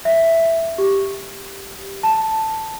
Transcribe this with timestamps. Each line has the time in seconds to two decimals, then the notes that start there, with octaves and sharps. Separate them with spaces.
0.05 E5
0.78 G4
2.03 A5